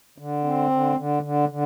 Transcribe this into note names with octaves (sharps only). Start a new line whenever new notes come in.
D3
C4
D3
D3
D3
D3